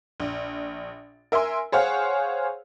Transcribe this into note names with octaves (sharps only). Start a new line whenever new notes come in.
A#1
A#4 E5 G#5 C6
G#4 C5 C#5 F5 F#5